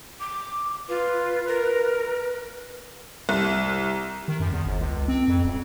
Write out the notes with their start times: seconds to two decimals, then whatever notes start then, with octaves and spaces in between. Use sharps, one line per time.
0.20 D6
0.89 F4 B4
1.47 A#4
3.29 C2
4.28 D#3
4.40 F#2
4.52 E2
4.66 G1
4.80 C#2
5.08 C4
5.28 F2
5.44 D#1